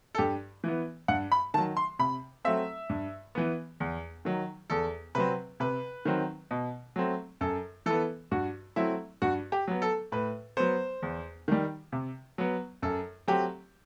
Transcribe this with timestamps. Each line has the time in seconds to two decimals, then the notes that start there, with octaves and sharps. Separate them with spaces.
0.15 A4
0.18 G2 G4
0.64 E3 B3
1.08 G2 F#5
1.32 B5
1.54 D#3 A5
1.58 F#3
1.77 C6
1.99 C3 B5
2.45 F#3 A3 C4 E5
2.89 G2
3.35 E3 B3
3.80 E2
4.25 D#3 F#3
4.70 E2 A4
5.15 C3 F#3 C4 B4
5.60 C3 B4
6.05 D#3 F#3 C4
6.51 B2
6.96 F#3 A3 C4
7.41 F#2 A4
7.86 E3 B3 A4
8.31 G2 F#4
8.76 F#3 A3 C4 E4
9.22 G2 F#4
9.52 G4
9.68 F#3 B3
9.82 A4
10.12 A2 B4
10.57 F#3 B3 C5
11.02 E2
11.48 D#3 G3
11.92 C3
12.38 F#3 B3
12.82 F#2 A4
13.28 F#3 A3 C4 G4